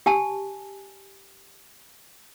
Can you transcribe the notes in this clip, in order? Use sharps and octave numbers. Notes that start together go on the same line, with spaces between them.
G4 G#5 A5